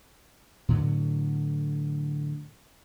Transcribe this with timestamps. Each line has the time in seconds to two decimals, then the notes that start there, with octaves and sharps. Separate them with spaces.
0.69 A2 D3 F#3 B3